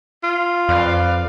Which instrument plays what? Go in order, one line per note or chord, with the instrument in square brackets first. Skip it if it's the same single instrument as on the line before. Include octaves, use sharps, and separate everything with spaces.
[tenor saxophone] F4
[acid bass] F2 [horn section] B4 D5 F5